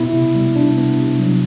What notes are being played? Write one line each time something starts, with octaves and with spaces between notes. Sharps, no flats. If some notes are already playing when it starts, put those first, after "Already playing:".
Already playing: B2 B3 E4
C3
G3
C3 D4
B3
C3
F#3